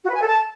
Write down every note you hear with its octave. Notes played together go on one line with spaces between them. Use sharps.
F#4
B4
G#5
A4
A5